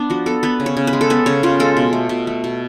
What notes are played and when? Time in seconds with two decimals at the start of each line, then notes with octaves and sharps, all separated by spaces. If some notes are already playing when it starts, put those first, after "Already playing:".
Already playing: B3 D4
0.10 F3 F#4
0.26 B3 A4
0.43 B3 B4
0.60 C#3
0.66 C#5
0.77 C#3
0.87 B4
0.93 G#3
1.01 A4
1.10 B3 B4
1.26 C#3 C#5
1.43 C#3 F4
1.60 G#3 A4
1.77 B2
1.93 A3
2.09 B2
2.27 A3
2.44 B2